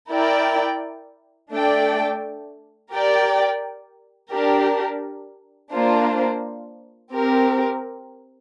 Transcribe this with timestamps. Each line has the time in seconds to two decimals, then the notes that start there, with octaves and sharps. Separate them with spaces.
0.11 E4 A#4 D5 G5
1.52 A3 D4 A4 D5 G5
2.92 G4 A#4 D5 G5
4.32 D4 G4 A#4
5.72 A#3 D4 F4 C5
7.13 C4 G4 A#4